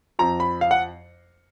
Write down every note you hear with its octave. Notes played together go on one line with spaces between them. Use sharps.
F2 F3 A#5
B5
F5
F#5